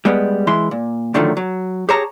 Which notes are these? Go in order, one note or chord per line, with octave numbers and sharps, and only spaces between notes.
G3 G#3 B3
E3 G#3 E4 C6
A#2
A2 D3 D#3 F3 F#3 A3
F#3
G4 G#4 C#5 A5 A#5